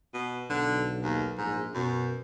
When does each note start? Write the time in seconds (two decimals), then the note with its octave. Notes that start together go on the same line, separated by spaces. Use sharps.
0.14 B2
0.50 B1 D3
1.03 D#2
1.38 A#1 G#2
1.74 F#2 B2